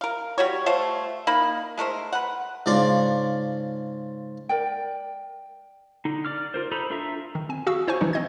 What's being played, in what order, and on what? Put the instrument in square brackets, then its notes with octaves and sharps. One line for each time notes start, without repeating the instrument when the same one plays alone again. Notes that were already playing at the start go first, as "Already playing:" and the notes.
[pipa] A#4 F5
G3 F#4 C#5
A3 F4 C5 C#5
A#3 D#4 B5
G#3 A3 A#4 C5
B4 F#5
[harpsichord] G#2 C#3 D4 F4 D5 D6
[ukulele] A#4 D5 G5
[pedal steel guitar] D3 D#4
D5 D6 F6
F4 A#4 C5
D#4 A4 C5 A#5 B5
D4 F4 A4 E5 A#5
[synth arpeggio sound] D#3
C4 G#5
F#4 G#4 F5 C#6 E6
E4 C5 C#5 G#5 C#6
E3 F3 G3 D4 D#4
C4 D#5 G#6